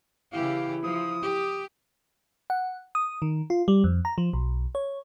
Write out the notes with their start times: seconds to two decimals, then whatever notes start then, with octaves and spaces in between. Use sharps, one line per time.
0.33 C#3 E3 E4 G4 F5
0.84 F3 D#6
1.22 G4
2.50 F#5
2.95 D#6
3.22 D#3
3.50 F4
3.68 G3
3.84 F2
4.05 A#5
4.18 F3
4.33 B1
4.75 C#5